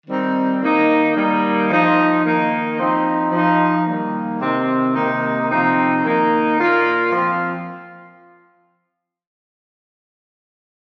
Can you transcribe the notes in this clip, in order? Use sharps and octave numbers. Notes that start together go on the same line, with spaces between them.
D#3 G3 C4 D#4
D#3 A#3 D#4
D#3 G3 A#3 D#4
F3 D#4
D#3 A#3 D#4
F3 C4 D#4
F3 D#4
D#3 G3 A#3
C3 D#3 C4
C3 D#3 A#3 D#4
C3 F3 C4 D#4
D#3 A#3 D#4
A#2 A#3 F4
F3 C4 F4